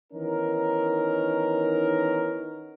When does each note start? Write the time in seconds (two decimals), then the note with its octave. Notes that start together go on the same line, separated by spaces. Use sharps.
0.13 D#3 E3 B3 C#4 D#4 A#4